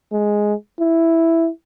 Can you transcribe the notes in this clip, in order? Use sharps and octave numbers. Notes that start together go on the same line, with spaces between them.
G#3
E4